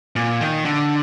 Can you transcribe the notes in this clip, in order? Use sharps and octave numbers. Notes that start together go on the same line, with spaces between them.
A#2
D#3
D3